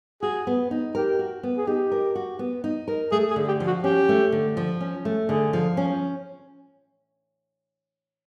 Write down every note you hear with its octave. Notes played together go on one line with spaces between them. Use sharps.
F#4 G#4
B3
D#4
G4 A#4
F#4
B3
G#4
D#4 G4
A#4
F#4
B3
D#4
A#4
A3 G#4
G#4
D3
G4
F3
F#4
C#4 G4
A3
D3
F3
C#4
A3
D3 G#4
F3
C#4